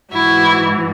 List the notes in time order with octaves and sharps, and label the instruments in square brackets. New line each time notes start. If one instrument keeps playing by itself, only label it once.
[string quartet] G#2 E3 E4 F#4